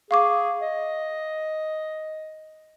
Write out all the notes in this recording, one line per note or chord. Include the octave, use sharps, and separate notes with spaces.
G#4 F5 C#6 D6
D#5